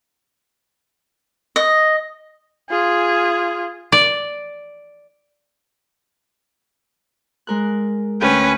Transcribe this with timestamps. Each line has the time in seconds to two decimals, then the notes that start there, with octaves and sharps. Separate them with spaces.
1.56 D#5
2.70 F4 G#4
3.92 D5
7.47 G#3 A#4 F#6
8.21 D2 C#4 B4 G5 G6